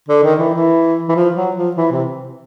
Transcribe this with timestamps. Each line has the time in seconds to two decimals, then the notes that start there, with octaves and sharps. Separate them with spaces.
0.09 D3
0.23 D#3
0.39 E3
0.54 E3
1.09 E3
1.15 F3
1.36 F#3
1.56 F3
1.76 E3
1.92 C3